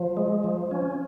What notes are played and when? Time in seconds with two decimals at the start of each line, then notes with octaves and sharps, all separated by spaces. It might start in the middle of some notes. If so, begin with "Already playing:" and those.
Already playing: F3
0.17 G#3
0.44 F3
0.71 C#4